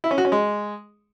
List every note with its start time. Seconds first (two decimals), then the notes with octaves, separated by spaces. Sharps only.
0.04 E4
0.11 C#4
0.18 F#4
0.25 C#4
0.32 G#3